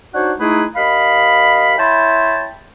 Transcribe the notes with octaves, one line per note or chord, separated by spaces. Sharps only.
D4 D#4 F#4 C5 C#5 F#5
G#3 A3 D#4 E4 G#4 B4
D#2 D#5 F5 B5
E4 C#5 G5 A5 B5 C6